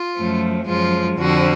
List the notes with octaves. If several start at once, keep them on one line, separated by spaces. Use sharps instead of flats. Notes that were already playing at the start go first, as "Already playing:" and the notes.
Already playing: F4
F#2 F3 A3
F#2 F3 G#3 F4
F2 D3 F3 F#4